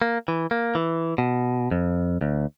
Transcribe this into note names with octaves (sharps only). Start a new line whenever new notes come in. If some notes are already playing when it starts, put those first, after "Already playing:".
A#3
E3
A#3
E3
B2
F2
D2